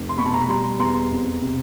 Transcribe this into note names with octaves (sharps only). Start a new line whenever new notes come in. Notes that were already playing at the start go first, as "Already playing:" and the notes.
Already playing: F1
C6
B2 B5 C#6
A5
A#5
B5
G3 A#5 C6
E2 A#5 C6
F2
C3